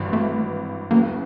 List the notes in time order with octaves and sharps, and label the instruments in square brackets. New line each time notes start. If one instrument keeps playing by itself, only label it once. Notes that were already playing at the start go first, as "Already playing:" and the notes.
Already playing: [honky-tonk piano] G#1 G2 E3
[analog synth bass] A3
[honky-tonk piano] E2 C#3 F#3 [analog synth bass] A#3